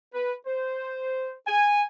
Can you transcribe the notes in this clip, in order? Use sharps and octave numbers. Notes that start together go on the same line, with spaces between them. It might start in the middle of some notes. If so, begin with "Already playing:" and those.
B4
C5
G#5